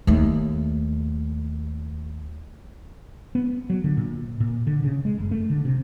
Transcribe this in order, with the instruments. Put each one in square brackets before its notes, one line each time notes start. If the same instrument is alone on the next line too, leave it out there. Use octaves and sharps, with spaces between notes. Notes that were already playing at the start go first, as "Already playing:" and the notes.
[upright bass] D#2 A3
[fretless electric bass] B3
F#3
D3
A#2
A#2
D3
C#3
G#3
F#1
A3
D3
C3